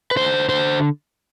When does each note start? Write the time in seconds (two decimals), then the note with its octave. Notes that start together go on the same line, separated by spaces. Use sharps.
0.11 B4
0.16 D3 C5
0.49 D3 C5